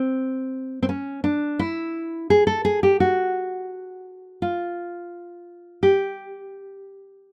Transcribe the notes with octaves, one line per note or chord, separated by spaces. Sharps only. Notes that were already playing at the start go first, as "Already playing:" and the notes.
Already playing: C4
C4
C#4
D4
E4
G#4
A4
G#4
G4
F#4
F4
G4